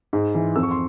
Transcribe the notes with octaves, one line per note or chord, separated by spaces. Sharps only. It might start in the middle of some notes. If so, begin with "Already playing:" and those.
G#2
E3
F2 E6
C#6
C6